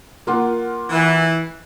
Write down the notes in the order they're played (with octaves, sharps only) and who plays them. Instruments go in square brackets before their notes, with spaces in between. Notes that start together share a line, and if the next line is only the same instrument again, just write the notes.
[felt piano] A#3 F4 F#5
[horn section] E3